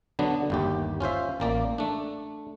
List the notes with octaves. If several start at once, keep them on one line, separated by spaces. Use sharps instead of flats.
D3 F#3 B3 D4
G1 D#2 G4
C#4 F4 C5 E5
A1 A#3 D5
A3 D4